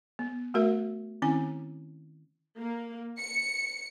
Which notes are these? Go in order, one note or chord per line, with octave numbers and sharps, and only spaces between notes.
B3
A3 F#4 A#4 E5
D#3 C4 C#4 E4 G#5
A#3
C#7